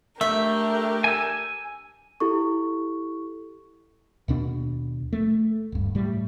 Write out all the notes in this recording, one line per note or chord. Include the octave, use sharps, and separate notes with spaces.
A3 D4 G4 A#4 E5
G#5 E6
E4 G4 A4 C#6
D#2 B2 D4
A3
D1 G2
A2 G3